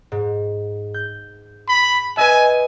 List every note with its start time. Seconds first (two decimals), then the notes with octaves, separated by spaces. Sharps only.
0.12 G#2
0.94 G6
1.68 B5
2.17 B4 D#5 E5 G#5